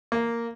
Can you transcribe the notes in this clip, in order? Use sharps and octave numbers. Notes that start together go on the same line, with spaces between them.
A#3